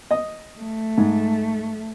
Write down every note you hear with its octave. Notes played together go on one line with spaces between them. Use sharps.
D#5
A3
G#2